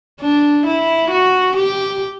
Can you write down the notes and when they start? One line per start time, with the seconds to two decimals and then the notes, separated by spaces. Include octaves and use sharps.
0.22 D4
0.66 E4
1.10 F#4
1.55 G4